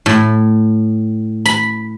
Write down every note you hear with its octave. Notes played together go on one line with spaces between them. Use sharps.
A2
B5